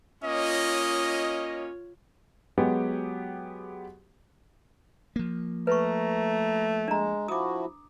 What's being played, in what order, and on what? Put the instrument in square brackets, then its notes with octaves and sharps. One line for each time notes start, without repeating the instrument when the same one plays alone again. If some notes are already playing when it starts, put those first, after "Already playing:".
[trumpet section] A#3 C#4 D#5 [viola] F4 C#5
[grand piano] F#3 G#3 B3 G4 G#4
[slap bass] F3 A#3
[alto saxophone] A3 [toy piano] B4 C#6 [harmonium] A#5
[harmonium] G#3 [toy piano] D4 A#5
[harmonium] F3 E4 F#4 [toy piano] D6 D#6